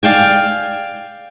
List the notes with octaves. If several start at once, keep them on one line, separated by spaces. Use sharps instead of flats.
D5 F5 G5 G#5